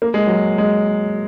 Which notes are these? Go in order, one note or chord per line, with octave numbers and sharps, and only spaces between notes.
A#3
G#3
F#3
G#3